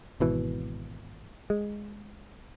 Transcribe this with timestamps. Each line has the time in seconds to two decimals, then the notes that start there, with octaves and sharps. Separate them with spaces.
0.20 G#1 B2 E3
1.50 G#3